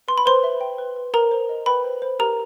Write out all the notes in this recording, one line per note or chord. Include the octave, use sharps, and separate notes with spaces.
B4 C6
B5
B4 C5 C6
E5
G5
B4
B4
A#4 C5 A#5
C5
D#5
B4 G5 B5
C5
C5
G4 A#4 A#5